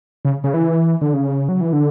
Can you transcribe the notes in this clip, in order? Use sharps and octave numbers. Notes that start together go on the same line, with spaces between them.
C#3
C#3
E3
D3
C#3
F#3
E3
D3